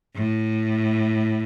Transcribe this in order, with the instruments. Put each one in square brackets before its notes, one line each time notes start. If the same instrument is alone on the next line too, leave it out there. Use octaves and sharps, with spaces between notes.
[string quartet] A2